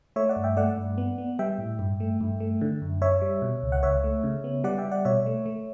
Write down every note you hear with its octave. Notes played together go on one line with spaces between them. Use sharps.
A3 C#5 E5
D5 F#5
G2
E5 G5
A3 D5 F#5
G2
B3
B3
G3 E5 G5
A2
G2
A3
G2
A3
D3
F#2
F#2 C#5 E5
G3
B2
C#2
F#5
C#2 C#5 E5
A3
C#3
B3
G3 D5 F#5
E5 G5
G3
D5 F#5
B2 C#5 E5
A3
A3